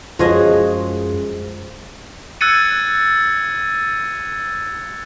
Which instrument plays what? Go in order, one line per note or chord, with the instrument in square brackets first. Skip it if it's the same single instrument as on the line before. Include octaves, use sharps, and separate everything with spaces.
[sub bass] F#2 [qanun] F3 [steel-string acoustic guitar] G#3 C#5 [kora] F#4 G#4 D#5
[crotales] E6 F#6 G#6 A6 C#7 D#7